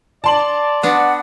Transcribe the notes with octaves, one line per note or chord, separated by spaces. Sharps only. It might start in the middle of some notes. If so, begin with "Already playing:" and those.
D5 A5 C6 F#7
B3 D4 F#5